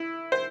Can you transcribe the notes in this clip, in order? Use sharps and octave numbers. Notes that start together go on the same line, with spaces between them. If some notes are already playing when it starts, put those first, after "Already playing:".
Already playing: E4
C5